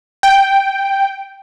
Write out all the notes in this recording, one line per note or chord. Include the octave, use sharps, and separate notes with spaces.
G5